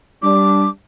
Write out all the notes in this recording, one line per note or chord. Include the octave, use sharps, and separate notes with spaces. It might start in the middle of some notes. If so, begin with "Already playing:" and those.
G3 D4 D6